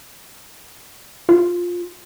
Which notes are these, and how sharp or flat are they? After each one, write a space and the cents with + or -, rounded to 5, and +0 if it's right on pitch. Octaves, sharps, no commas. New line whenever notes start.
F4 +10